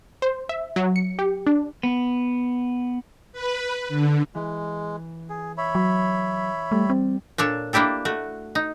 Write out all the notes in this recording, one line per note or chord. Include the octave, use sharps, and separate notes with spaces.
C5
E5
F#3
C#7
G4
D4
B3
B4
D3
E3 G#3
G#4
C#5 E5 B5
F#3
G3 A3
C4
A#2 D4 A4 C#5
A#3 D4 E4 G4 A4
A3 F#4
D#4